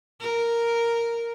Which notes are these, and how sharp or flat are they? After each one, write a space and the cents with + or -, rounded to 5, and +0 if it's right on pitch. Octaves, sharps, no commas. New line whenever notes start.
A#4 -5